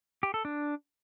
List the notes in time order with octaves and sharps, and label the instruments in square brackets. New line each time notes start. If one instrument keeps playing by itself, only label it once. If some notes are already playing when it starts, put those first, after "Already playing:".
[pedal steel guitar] G4
A4
D4